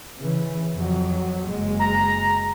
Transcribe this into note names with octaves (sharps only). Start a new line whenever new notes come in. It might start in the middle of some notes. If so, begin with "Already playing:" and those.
C#3 E3
F2 F#3
F#1 G#3
A#5